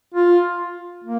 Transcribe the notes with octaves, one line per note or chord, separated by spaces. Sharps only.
F4
A#3